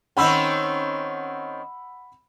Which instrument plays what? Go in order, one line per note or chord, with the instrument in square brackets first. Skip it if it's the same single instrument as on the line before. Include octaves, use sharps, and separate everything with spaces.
[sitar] D#3 C4 C#4 [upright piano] F#5 B5 E6